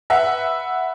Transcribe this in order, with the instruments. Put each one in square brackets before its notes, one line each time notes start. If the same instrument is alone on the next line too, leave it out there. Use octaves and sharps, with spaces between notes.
[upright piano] B4 E5 F#5